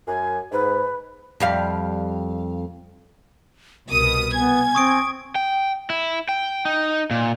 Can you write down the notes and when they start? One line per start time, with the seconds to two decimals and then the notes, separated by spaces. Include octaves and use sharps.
0.07 F#2 G#5
0.52 G#2 B4
1.40 F2 G3 F5
3.90 C2 B2 A#4 D#6
4.34 B3 G#5 G#6
4.75 C4 C#6 D#6 D7
5.35 G5
5.90 E4
6.29 G5
6.65 D#4
7.11 A#2